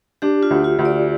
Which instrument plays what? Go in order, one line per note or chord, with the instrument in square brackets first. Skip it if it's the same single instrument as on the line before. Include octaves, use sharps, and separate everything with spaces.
[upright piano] D4 [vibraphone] G4
[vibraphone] F4
[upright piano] D2
[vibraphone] F4
[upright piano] D2
[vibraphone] D5